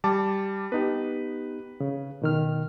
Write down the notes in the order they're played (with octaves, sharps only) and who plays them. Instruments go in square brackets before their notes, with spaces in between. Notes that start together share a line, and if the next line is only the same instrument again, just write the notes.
[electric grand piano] G3 A5 D6
[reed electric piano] B3 D#4 G4 [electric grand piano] B4
[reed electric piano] C#3
B2 D#3 F6